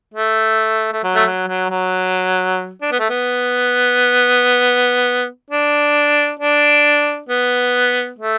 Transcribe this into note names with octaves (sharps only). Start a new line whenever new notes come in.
A3
A3
F#3
A3
F#3
F#3
F#3
D4
B3
A3
B3
D4
D4
B3
A3